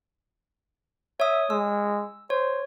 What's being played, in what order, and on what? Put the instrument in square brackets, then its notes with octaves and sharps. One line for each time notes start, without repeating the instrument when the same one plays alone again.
[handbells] C#5 D#6 [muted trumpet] E5
[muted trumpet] G#3 [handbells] E6
[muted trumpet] C5 [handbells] C#5